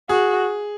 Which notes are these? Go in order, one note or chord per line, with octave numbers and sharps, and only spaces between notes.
F#4 G#4